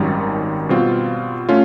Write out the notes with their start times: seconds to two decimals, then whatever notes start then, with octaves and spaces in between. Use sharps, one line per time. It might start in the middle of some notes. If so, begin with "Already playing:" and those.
Already playing: G#1 F#2 D#3 G3
0.69 B2 G3 C4 F4
1.49 A3 C#4 F4